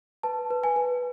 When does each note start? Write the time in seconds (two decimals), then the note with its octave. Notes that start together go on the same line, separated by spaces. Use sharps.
0.23 B4 A5
0.51 B4
0.64 G#5
0.76 B4